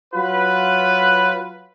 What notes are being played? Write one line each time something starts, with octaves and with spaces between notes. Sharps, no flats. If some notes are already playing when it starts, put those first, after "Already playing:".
F#3 F4 B4